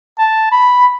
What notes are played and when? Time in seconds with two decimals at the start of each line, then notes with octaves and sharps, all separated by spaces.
0.19 A5
0.52 B5